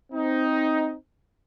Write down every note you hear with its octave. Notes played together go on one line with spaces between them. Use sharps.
C4 D#4